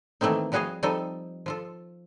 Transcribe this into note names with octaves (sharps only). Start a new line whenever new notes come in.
D#3 E3 A3 A#3 C4 D#4
F3 G3 F#4 G#4 D#5 F5
F3 G3 C4 D#4 A4 D#5
F3 F4 A4